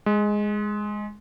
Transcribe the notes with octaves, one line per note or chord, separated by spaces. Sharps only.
G#3